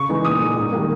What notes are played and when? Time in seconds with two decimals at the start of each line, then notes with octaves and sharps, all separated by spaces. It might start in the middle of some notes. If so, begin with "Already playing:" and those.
Already playing: C#3 C#6
0.09 E3 G#3 D#4
0.25 A#2 D#6
0.41 G#3 D#4
0.57 G#2
0.72 D#3 G3 A#3